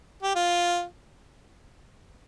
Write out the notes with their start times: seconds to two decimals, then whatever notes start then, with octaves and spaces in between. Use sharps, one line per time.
0.23 G4
0.35 F4